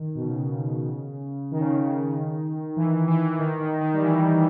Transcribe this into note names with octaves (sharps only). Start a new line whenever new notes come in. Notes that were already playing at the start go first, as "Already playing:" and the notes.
Already playing: D#3
B2
C#3
D#3
C#3
D#3
E3
E3
D#3
D#3
D#3
G3
E3